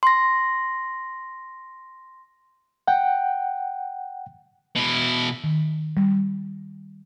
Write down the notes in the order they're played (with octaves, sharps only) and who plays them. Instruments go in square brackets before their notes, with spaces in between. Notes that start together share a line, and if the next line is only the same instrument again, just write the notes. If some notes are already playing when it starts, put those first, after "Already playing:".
[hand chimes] C6 A#6
[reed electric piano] F#5 G5
[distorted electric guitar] B2 E4
[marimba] D#3
G3